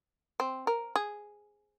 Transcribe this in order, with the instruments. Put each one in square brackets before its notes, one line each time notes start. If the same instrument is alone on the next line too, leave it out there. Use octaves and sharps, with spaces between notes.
[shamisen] C4
A#4
G#4